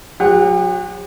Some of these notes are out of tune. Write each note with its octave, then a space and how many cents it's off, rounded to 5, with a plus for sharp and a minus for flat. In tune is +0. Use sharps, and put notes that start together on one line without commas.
F#3 -25 G4 +45 F#5 +0